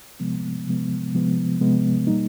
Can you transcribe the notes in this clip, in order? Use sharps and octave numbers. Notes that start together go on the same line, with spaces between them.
C3 F3 G#3 B3
C3 F3 G#3 B3
C3 F3 G#3 B3
C3 F3 G#3 B3
B2 G3 A#3 D#4